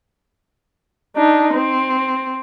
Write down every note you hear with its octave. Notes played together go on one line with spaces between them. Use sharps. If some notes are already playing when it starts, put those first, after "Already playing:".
D4 D#4
C4